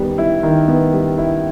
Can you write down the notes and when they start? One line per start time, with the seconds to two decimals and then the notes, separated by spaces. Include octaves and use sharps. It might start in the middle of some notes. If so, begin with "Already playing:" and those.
Already playing: D#3 G3 B3
0.18 E4
0.43 D#3
0.68 B3
0.93 G3
1.18 E4